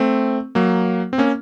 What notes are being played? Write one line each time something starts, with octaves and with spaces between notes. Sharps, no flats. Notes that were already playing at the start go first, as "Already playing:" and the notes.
Already playing: A3 C4
F#3 A#3
C4
A#3 C#4